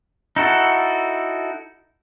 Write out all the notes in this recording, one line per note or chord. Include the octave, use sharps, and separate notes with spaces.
D#4 E4 F#4 A4